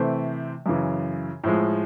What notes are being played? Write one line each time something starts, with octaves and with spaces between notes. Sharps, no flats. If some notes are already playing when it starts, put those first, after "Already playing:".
Already playing: C3 E3 A3 C4
F#2 C#3 E3
A2 F3 G#3